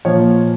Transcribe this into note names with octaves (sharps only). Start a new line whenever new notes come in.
A#2 F3 C#5